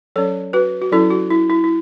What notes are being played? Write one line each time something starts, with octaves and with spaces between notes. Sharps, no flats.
F#3 C#4 A4 C#5
F#4 B4
F#4
F#3 C#4 E4 A4
F#4
E4
E4
E4